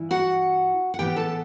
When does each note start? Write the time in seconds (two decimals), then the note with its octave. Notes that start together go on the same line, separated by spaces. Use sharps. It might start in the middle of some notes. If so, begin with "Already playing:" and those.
Already playing: G2 E3 E4
0.11 F#4 F#5
0.94 F#5
0.99 A2 E3 B3 G4 G5
1.16 A4 A5